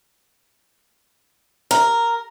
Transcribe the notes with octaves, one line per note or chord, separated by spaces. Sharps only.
A#4